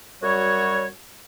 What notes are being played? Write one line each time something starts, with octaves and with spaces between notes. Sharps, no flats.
F#2 G3 F#4 C#5